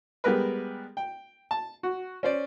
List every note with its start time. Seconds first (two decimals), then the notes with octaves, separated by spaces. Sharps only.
0.24 G3 G#3 B3 A#4 B4
0.97 G5
1.51 A5
1.83 F#4
2.23 C#4 C5 D5